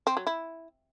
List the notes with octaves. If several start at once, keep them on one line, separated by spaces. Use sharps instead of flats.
C4
F#3
E4